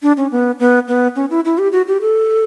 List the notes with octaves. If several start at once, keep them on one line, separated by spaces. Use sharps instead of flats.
D4
C#4
B3
B3
B3
C#4
E4
E4
G4
F#4
G4
A4